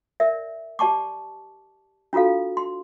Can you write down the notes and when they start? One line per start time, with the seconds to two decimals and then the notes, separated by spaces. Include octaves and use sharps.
0.20 A#4 D5 E5
0.79 G4 D5 A5 C#6 D6
2.13 D4 F4 F#4 A4 F5
2.57 C6